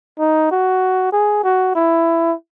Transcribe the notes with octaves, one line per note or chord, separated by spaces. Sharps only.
D#4
F#4
G#4
F#4
E4